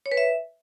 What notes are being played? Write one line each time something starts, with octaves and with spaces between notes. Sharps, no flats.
C#5
B4
E5